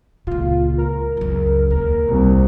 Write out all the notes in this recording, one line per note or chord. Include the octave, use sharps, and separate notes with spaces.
C#2 A#2 F4
A#4
C#2 F#2
D#2 A#4
C2